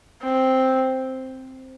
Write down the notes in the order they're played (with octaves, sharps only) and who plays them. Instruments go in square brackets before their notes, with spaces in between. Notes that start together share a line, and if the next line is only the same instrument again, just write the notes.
[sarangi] C4